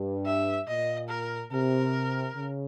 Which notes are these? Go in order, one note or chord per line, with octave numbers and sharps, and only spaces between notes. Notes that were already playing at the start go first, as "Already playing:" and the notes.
Already playing: G2
E5
A#2 D#5
A#4
C3 A#4
C#3